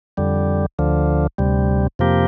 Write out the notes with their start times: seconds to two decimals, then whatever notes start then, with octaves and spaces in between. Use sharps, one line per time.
0.17 F2 D3 G3
0.79 D2 D3 F3
1.38 D2 C3 G3
1.99 F2 C3 F3 A#3 G4